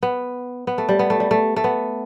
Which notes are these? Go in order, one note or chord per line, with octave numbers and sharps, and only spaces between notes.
B3
B3
A3
G3
B3
A3
G3
A3
A3
B3